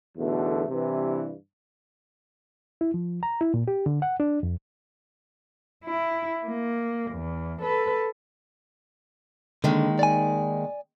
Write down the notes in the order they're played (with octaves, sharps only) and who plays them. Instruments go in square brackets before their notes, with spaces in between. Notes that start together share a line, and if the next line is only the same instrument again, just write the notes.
[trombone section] B1 E2 B2 D3 A3
G2 C3 E3
[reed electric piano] E4
F3
A#5
E4
A#2
G4
D3
F#5
D4
F2
[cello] E4
A#3
E2
A4 B4
[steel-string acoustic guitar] D#2 D#3 G#3 [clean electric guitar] D3
[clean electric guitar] D5 G#5